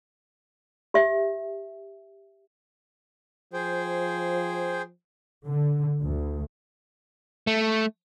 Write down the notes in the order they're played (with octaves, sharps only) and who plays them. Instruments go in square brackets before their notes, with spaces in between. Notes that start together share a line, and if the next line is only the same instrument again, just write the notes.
[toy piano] G4 E5
[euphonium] F3 [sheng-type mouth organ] G#4 C5 G5
[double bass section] D3
D2
[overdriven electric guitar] A3